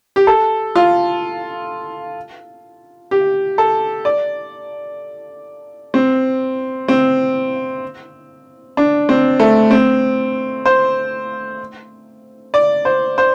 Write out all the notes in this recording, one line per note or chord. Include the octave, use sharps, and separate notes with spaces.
G4
A4
F4
G4
A4
D5
C4
C4
D4
C4
A3
C4
C5
D5
C5
C5